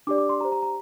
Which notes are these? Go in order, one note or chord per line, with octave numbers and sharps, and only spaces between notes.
D4 G4 D5 D6
D6
C6
G4 C5 A#5
A#5
A#5